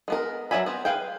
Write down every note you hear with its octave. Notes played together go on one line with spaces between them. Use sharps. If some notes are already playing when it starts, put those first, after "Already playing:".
G#3 B3 A#4
F#3 D5 E5 G#5 B5
B3 C4
G#4 B4 F5 G5